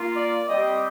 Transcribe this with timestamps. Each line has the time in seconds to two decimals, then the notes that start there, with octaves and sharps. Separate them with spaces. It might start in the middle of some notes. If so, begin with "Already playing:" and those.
Already playing: A#3 F4
0.16 D5
0.49 G3 C4 G4 D#5